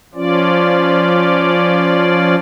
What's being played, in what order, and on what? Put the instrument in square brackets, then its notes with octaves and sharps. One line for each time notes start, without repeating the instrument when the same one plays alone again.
[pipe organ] F3 C#4 F4 D5